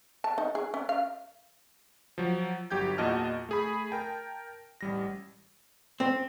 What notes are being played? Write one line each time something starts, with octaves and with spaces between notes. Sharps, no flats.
A5
D#4
G#4
C#4
F5
F3 F#3
G1 F#3 G4 G5 G6 G#6
E2 A#2 F#4 D#5 A5 F6
A3 G#4 B5
A#4 G5 A5
A1 G3 A#6
C4